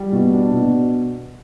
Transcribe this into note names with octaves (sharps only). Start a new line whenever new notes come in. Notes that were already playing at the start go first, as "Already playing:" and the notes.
Already playing: G3
B2
D4
B2